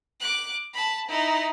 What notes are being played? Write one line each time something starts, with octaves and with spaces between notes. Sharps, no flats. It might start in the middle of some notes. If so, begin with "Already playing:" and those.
D6 F#6
A5 B5
D#4 E4